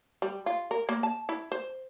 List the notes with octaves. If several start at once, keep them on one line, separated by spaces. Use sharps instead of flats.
G3
F4
A#4
A#3
A5
E4
C5